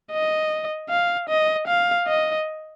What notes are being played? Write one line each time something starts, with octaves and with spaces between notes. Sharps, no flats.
D#5
F5
D#5
F5
D#5